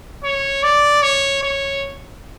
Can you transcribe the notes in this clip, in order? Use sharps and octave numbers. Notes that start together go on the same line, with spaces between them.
C#5
D5
C#5
C#5